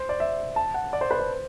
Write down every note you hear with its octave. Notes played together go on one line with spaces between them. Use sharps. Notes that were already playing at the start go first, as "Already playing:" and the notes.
Already playing: C5
D5
E5
A5
F#5
D5
C5
B4
C5